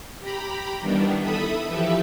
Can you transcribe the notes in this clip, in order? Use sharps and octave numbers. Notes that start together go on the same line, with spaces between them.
G4 A#5 B5
D#3 E3 G3 B3 D4
A4 E5 B5 D#6
E3 F3 G4 A4 B4 E5